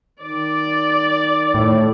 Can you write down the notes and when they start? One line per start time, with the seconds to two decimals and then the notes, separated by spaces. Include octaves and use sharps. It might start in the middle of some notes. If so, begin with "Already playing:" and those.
0.22 D#3 D5 D6
1.54 A2